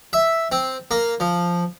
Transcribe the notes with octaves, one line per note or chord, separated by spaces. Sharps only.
E5
C4
A#3
F3